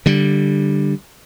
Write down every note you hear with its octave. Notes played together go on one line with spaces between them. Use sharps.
D3 G3